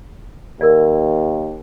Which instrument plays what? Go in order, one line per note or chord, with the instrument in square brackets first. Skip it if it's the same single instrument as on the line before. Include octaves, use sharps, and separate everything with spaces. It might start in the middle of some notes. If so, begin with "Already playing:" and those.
[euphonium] D#2 [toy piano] A#4 D5